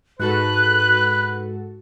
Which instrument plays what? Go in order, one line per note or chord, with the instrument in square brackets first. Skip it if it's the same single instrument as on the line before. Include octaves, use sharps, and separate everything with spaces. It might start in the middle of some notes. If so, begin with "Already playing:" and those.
[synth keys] G#2 F#4 A4 [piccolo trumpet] B4 [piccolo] F#6